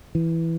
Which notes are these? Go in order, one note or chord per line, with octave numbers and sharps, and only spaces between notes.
E3